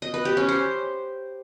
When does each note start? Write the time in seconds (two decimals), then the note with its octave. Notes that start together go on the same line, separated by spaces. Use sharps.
0.02 D#5
0.14 B4
0.25 G4
0.37 C#4
0.49 C5